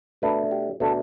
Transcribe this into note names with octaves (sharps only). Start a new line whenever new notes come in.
B2 A3 D4 B4
G4
B2 A3 D4 A4